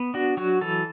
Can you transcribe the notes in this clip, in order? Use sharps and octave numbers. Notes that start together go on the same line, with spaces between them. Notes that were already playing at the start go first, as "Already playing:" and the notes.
Already playing: B3
D4 F#4
F#3 F#4
E3 A4